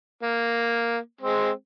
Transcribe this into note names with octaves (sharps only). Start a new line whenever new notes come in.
A#3
G#3 C4